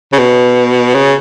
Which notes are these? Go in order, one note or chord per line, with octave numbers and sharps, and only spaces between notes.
C#3
B2
C#3